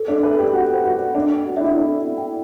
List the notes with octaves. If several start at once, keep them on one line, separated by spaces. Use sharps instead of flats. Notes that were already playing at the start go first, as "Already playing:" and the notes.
Already playing: A4
D4
A4
B4
A4
G4
F#4 A4
C5
F#4
A4
D4 A4
G5
F#4
D4 E4 E5
D4 A4
E5
G5